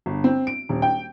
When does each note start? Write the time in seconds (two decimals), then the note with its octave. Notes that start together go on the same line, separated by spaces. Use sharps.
0.06 G1
0.24 C4
0.47 D7
0.69 D#1
0.82 G5